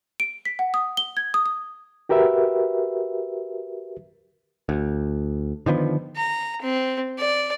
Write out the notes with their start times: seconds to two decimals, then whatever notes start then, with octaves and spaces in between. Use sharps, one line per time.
0.20 D7
0.45 B6
0.59 F#5
0.74 D#6
0.97 G7
1.17 G#6
1.34 D#6
1.46 D#6
2.09 F#4 G4 A#4 B4 E5
4.69 D2
5.66 D3 D#3 F3 B3
6.16 A#5
6.62 C4
7.19 D5